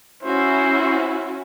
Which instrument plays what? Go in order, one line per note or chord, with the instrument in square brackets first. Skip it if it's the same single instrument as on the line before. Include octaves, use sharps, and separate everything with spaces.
[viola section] C#4 E4 F#4 [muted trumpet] C5